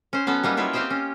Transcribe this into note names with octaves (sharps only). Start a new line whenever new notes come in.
C#4 C5
F#3 B3 C#4 A4
G3 A#3 B3 D#4
F#3 E4 F4 C#5 E5
C4 F4 G4 C5 D#5 G5
C#4